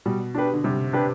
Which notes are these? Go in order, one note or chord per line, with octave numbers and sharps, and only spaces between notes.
B2 G3
D4 G4 B4
D3
C3 G3
D4 G4 B4